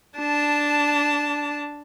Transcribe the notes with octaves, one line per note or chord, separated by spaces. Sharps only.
D4 A5